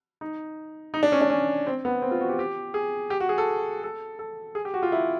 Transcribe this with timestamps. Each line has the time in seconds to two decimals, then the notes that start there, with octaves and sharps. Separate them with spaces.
0.21 D#4
0.94 D#4
1.03 D4
1.12 C#4
1.21 D4
1.30 C#4
1.67 C4
1.85 B3
2.02 C4
2.11 F4
2.21 F#4
2.29 G4
2.39 G4
2.74 G#4
3.10 G4
3.20 F#4
3.29 G#4
3.38 A4
3.84 A4
4.19 A4
4.55 G#4
4.65 G4
4.74 F#4
4.83 F4
4.92 E4